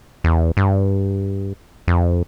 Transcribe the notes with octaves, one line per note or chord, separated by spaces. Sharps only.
E2
G2
F2